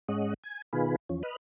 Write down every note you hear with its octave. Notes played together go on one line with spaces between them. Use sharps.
G#2 G#3 C#4 D#5 F#5
G#5
B2 D#3 F4 G#4 B4
E2 F3 C#4
B4 D#5 F6 F#6